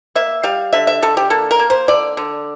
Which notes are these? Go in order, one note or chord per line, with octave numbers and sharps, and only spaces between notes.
A#3 E5
G3 F5
D3 E5
E5
D3 A4
G4
A#3 A4
A#4
A#3
C5
D3 D5
D3